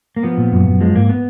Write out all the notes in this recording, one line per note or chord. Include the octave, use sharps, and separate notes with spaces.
A#3
F3 B3
A#2
F#2
F#2
F3 G#3
G#2 A#3
B3